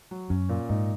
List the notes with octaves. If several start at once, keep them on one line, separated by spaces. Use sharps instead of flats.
F#3
F#2 C#4
A#2
G#2 D#4